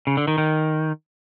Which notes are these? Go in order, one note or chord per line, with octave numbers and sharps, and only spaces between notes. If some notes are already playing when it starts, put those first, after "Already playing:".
C#3
D3
D#3
D#3